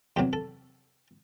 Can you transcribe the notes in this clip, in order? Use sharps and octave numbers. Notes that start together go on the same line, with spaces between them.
E2 C3 F#3 G4
A4